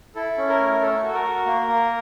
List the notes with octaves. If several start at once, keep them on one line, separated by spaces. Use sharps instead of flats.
E4 A4
C#4
A#4
A3
A4
F#4
A#4
F#4
A#3
A#3